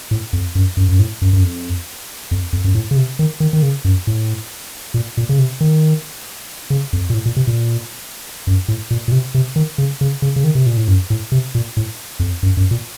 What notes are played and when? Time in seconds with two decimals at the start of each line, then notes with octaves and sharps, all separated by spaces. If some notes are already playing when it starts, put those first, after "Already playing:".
0.11 A2
0.33 F2
0.55 F#2
0.77 F#2
0.89 F#2
0.99 A2
1.22 F#2
1.33 F#2
1.43 F2
2.31 F2
2.53 F2
2.64 F#2
2.75 A2
2.91 C#3
2.96 C3
3.19 D#3
3.40 D#3
3.53 D#3
3.62 C#3
3.85 F#2
4.07 A2
4.94 A#2
5.17 A#2
5.29 C#3
5.39 C3
5.61 D#3
6.70 C#3
6.93 F2
7.10 A#2
7.14 A2
7.26 A#2
7.36 C3
7.47 A#2
8.47 F#2
8.68 A2
8.91 A#2
9.08 A#2
9.12 C3
9.34 C3
9.56 D#3
9.78 C#3
10.01 C#3
10.22 C#3
10.36 C#3
10.44 D#3
10.55 C3
10.66 A#2
10.77 A2
10.88 F#2
11.10 A2
11.32 C3
11.55 A#2
11.77 A2
12.20 F2
12.43 F#2
12.57 F#2
12.71 A#2